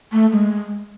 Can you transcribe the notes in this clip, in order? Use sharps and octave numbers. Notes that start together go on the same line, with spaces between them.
A3
G#3